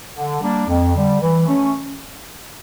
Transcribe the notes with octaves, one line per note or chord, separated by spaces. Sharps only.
D3
G3 A#3 D4
F2
D3 G3
E3
A3 C#4